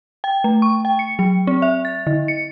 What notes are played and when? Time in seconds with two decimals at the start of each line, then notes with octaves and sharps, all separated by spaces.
0.24 G5
0.44 A3
0.62 C#6
0.85 G5
0.99 C#7
1.19 F#3
1.47 C4
1.62 E5
1.85 A6
2.07 D3
2.28 C#7